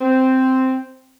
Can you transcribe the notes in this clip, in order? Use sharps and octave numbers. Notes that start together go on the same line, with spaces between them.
C4